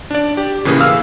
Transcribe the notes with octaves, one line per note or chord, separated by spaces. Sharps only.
D4 D5
G4
A2 C#3 E3 A#3 G#4
F5 E6 F6